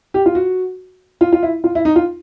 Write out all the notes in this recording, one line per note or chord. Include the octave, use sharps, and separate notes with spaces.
G4
F4
F#4
F4
F4
E4
F4
E4
D#4
F4